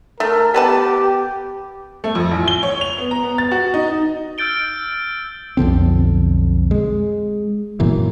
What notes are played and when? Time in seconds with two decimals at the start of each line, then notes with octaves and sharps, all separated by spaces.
0.20 A3 A#4
0.54 B3 G4 B4 A5
2.04 A3
2.15 F2
2.31 A1
2.48 G7
2.63 C#5
2.81 F7
2.98 B3
3.11 A#5
3.23 B3
3.38 A6
3.51 F#4
3.74 D#4
4.38 E6 F6 G6 A6 D7 G7
5.57 B1 F2 D3 C4
6.71 G#3
7.80 F#2 A#2 E3